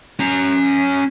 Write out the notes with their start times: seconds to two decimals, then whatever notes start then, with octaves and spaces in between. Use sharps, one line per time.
0.19 C#4 A#5